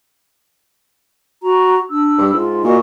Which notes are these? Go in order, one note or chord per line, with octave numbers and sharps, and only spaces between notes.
F#4 A#5
D4 E6
G2
G#2 F4
A#2 F#4 D#5